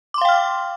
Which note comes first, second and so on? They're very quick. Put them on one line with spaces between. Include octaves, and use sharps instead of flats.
D6 C6 F5 G5 F6